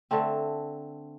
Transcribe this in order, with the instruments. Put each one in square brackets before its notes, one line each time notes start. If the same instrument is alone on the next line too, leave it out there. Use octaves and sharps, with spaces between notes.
[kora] D3 A3 C4